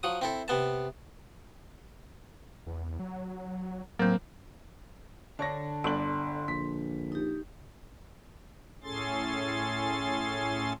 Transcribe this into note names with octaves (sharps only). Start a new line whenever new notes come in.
F3 F#3 D#6
C4 E4 A4
C3 B3 A5
E2
F#3
A2 F#3 A#3 C4 G6
D3 D4 C#5 A5 A#6
G1 D4 C6 F#7
A#1 B6
D#4 G4
A2 C#4 G#4 A4 C6 A6